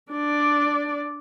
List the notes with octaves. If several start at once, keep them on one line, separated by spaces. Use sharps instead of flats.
D4 D5